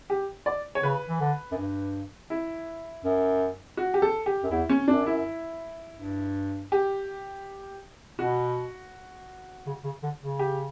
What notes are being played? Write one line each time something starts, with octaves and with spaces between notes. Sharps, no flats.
G4
D5
C#5
C#3 B4
E3
D3
F#2
G2
E4
F#2
F#4
G4
A4
G4
F#2
E2 E4
C#4
F#2 D4
E4
G2
G4
B2 F#4
C#3
C#3
D3
C#3
G4